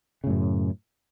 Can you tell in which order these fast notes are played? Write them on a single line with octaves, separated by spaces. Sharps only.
C#3 A2 F#2